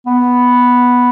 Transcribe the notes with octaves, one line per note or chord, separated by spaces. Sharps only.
B3